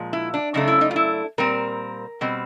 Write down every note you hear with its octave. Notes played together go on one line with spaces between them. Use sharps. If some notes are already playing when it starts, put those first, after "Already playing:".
Already playing: A#2 F3 G#3
E4
D4
F#2 C#3 A3 D4 D#4
E4
D#4
F4
E4
A#2 G3 C4 A#4
B2 G3 C4